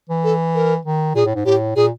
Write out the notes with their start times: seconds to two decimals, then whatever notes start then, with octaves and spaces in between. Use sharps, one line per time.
0.09 E3
0.24 A4
0.55 A#4
0.85 D#3
1.15 A#2 G#4
1.25 A2
1.35 G#2
1.45 A2 G4
1.76 A#2 G#4